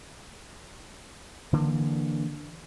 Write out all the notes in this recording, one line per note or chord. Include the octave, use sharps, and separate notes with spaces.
D3 E3 A#3